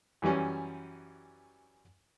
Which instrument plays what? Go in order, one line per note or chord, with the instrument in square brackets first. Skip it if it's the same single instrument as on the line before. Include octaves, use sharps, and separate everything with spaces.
[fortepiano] F#2 E3 G3 C#4